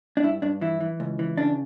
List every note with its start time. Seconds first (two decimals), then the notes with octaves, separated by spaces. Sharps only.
0.17 D4
0.23 G2 E4
0.42 G2 D4
0.61 E3 E4
0.80 E3
1.00 C#2
1.19 E3
1.37 C#3 D4